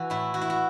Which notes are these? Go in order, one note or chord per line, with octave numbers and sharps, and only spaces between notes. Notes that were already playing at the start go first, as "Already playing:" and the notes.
Already playing: E3 F#4
A2 E4
E3 F#4
E4
F#4